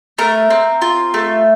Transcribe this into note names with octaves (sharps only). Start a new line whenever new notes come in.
A3 A#4
C4
F4
A3